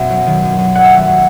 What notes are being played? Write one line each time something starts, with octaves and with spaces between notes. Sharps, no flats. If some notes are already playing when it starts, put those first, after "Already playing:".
Already playing: F#2 B2 E5
F#3
D#3
F#2
F#2
G2 F#5
E5
A3 F#5
F#3